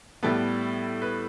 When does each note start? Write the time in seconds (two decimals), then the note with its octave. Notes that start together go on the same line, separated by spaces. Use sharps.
0.23 A2 G3 B3 A4
1.02 B4